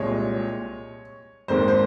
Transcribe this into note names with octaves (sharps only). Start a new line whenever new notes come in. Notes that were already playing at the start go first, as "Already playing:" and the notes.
Already playing: C2 A#2 G#3 C#5
G#1 G#2 D#3 A#3 C5
C5